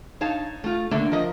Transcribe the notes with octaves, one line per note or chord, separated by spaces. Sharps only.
D#4 C#5 F5 A5
A3 F4
D3 A3 A#3
F3 A#4 D#5